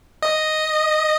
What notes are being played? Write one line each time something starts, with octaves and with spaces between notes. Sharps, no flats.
D#5